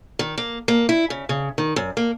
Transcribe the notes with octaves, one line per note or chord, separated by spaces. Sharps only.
D#3
A#3
A#3
E4
C#3
C#3
D#3
F#2
A#3